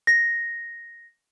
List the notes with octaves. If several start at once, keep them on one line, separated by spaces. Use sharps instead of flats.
A#6